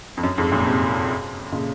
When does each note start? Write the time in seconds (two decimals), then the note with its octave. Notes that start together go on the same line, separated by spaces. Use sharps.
0.17 F2
0.23 F#2
0.38 F2 G#2
0.52 F#2 A#2
0.66 G#2 C3
1.52 A#2 C#3